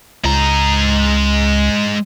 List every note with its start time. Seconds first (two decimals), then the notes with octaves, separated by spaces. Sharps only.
0.24 C#2 G#3 A#5